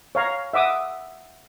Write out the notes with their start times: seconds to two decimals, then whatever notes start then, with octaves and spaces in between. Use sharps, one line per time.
0.15 C#5 F5 A#5
0.53 E5 F#5 D6 D#6